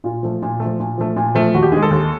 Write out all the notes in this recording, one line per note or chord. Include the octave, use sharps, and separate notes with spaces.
A#2 F4
F3 A3
A#2
A3
F3
A#2
F3 A3
A#2
F3 A3
D#2 F#4
G4
D#3 G#3 G#4
A4
D#2